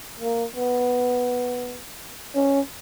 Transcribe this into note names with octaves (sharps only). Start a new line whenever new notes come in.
A#3
B3
C#4